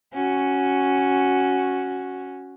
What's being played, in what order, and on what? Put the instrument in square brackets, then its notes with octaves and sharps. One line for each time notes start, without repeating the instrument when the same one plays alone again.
[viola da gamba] C#4 F#4